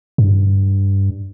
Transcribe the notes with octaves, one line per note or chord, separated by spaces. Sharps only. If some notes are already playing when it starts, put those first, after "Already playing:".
G2